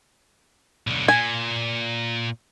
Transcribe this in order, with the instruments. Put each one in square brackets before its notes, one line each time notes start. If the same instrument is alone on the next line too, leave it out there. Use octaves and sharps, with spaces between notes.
[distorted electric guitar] B1 D3
[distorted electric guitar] A#2 [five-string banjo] G#5